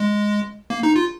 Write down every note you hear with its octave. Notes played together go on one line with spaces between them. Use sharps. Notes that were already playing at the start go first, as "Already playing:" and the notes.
Already playing: G#3
A#3
D#4
F4